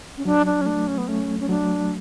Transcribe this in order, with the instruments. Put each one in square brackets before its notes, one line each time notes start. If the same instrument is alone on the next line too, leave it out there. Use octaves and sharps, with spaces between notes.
[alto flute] C#4
[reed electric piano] F#3 [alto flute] D4
[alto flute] D4
C#4
[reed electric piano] A3 [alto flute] D4
[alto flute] C#4
B3
[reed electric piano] A3 [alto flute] C#4
[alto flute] C#4
[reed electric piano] F#3 [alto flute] D4